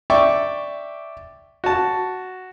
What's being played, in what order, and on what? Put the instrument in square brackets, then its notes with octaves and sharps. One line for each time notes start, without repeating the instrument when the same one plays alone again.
[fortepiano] D5 E5 G5 C#6 D6
F#4 A5